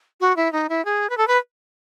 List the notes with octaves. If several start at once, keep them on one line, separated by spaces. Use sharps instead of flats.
F#4
E4
D#4
E4
G#4
B4
A4
B4